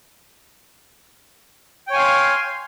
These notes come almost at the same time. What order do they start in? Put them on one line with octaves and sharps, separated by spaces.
G5 C#5 G#5 F5 C6